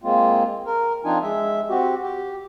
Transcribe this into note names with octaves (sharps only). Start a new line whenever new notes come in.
G#3 A#3 C4 F4
A#4
F3 C4 D4 D#4 F4 G#5
G#3 E5
C4 F#4 G4
G4